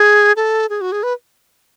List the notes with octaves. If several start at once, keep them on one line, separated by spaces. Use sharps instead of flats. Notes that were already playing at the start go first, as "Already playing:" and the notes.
Already playing: G#4
A4
G#4
F#4
G#4
B4